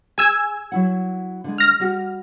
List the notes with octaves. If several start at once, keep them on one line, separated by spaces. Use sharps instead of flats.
G#4 G#5 E6 G#6
F#3 E4 F#5
D3 G#3
F6 A#6
G3 F#4 G4